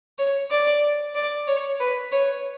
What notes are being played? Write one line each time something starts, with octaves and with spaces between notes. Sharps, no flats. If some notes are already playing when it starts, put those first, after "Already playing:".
C#5
D5
D5
C#5
B4
C#5